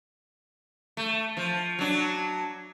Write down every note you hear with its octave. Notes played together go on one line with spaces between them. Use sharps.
A3
F3
F#3 D4